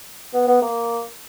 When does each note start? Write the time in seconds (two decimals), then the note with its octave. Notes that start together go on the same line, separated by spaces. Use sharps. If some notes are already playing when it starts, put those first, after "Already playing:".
0.34 B3
0.47 B3
0.62 A#3